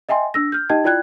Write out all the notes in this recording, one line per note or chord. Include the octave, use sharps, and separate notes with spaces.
D#5 E5 G5 G#5 C6
D4 E6 A#6
F6 G6
D#4 G4 D#5 G5 A5 G#6
E4 F4 D5 G5 F#6 G#6